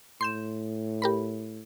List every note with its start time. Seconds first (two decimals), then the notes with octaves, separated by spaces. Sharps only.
0.21 A2 C6 G6 E7
1.02 G4 A#4 B5